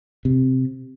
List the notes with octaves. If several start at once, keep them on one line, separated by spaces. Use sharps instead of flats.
C3